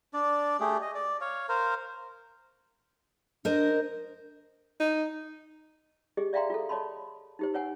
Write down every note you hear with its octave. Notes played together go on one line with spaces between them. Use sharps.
D4 D5
A3 G4 G#4
D#5
D5
C#5 F5
A#4 C5 F5
D4 A#4 C5 D#5
D#4
G4 G#4 D#5
D5 E5 F5 G5 A#5 C6
F4 G#4 A4
A4 C#5 D#5 A5 B5 C6
D#4 G4 C5
B4 C#5 F#5 G#5